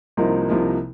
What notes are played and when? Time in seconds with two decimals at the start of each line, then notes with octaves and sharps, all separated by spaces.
0.17 C2 C3 F3 A#3 D#4
0.49 C2 C3 F3 A#3 D#4